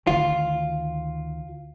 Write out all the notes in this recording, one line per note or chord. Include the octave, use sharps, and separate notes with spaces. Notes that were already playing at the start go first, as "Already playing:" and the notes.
D2 D#3 F4